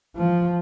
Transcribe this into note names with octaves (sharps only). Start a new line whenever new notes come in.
F3